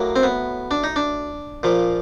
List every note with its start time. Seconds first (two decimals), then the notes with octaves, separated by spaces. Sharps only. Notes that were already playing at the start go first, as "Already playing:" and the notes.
Already playing: A2 F#3 A#3
0.16 C4
0.23 B3
0.71 D4
0.84 D#4
0.96 D4
1.63 A#2 F3